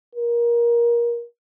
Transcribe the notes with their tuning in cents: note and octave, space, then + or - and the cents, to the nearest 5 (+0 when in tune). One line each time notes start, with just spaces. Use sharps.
A#4 +20